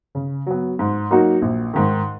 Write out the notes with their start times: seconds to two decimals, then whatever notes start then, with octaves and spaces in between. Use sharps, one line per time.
0.15 C#3
0.46 F#3 B3
0.79 G#2
1.11 F#3 A#3 D#4 F#4
1.42 A#1
1.74 G#2 D#3